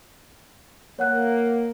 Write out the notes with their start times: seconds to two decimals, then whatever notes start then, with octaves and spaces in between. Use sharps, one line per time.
0.99 A#3 C#5 F#5 F#6